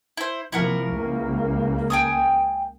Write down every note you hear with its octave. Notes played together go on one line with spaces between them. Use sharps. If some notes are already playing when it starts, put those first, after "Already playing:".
E4 C5
C3 F3 A#3 E4 F#4 A#4
C#2 A#3
G5 G#5 D#6